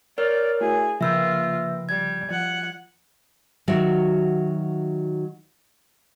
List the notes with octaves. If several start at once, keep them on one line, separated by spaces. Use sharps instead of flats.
A#4 C#5 D5 F6 A6
A3 E4 F#4 G#4
C#3 F3 A#3 F4 B4 E5 G5 E6
G3 G#6
F3 F#5
D#3 F#3 F#4 E5